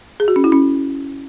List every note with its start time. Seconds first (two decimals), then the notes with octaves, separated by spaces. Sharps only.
0.20 G#4
0.28 F#4
0.36 C#4
0.44 E4
0.52 C#4